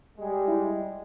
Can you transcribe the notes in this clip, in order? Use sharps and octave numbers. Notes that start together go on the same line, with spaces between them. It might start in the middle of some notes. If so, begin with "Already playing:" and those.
G3 G#3
E4